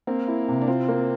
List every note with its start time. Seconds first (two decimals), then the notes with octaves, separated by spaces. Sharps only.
0.07 A#3 C4
0.28 E4
0.48 C3
0.62 D4
0.67 C4 F4
0.88 A#3